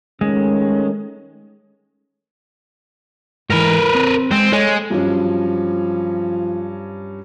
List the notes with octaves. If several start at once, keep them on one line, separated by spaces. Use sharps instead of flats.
D#3 G#3 A3 C#4
G#2 E3 A#4 B4
C4
G#3 C4
G#3 A4 C#5
G2 F3 F#3 C#4